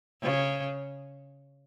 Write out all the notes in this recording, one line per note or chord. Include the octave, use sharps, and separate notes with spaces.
C#3